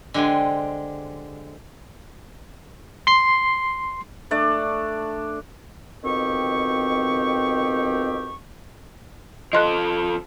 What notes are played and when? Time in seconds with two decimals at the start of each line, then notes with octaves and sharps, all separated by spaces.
0.14 D3 G#3 G4 C5 G#5
3.07 C6 C7
4.31 A3 D4 D5
6.04 F2 B2 D#3 C4 G4 C#6
9.53 F3 A4 D#5 C6 F#6